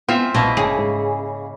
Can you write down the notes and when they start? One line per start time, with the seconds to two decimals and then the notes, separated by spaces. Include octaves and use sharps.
0.09 B3 C4 F4 E5 G#5
0.34 A#1 B2 A#3 E4 D#5
0.57 G1 C#3 G#4
0.78 G#2